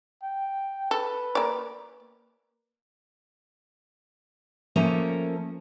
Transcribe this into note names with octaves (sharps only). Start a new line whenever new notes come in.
G5
A4 B4
A#3 D5
F3 A3 A#3 C#4 A#5